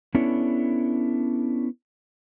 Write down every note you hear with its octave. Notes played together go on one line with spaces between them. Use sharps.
B3 C#4 D4 E4 A4 C#5